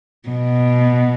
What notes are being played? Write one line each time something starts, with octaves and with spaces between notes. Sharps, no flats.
B2